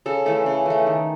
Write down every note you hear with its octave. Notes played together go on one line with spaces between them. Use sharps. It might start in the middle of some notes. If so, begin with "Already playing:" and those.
C#3 A4
E3 A3 A4
C#3
E3 A3
D#3